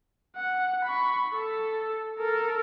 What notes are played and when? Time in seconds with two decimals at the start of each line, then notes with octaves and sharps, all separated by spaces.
0.36 F#5
0.85 B5 C#6
1.34 A4
2.19 A4 A#4